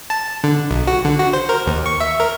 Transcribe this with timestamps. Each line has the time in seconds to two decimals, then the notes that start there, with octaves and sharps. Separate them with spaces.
0.10 A5
0.44 D3
0.71 B1
0.87 F#4
1.05 D3
1.19 F#4
1.33 C5
1.49 A#4
1.67 D#2
1.86 C#6
2.00 E5
2.20 A#4